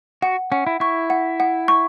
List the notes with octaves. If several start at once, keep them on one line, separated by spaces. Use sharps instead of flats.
F#4 F#5
C#4 F#5
E4
E4 C#6
F#5
F#5
C#6